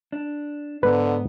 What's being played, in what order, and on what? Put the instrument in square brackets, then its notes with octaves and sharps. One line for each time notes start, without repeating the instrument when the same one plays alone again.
[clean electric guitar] D4
[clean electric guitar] G#2 [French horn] D3 [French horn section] B3 [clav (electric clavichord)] B4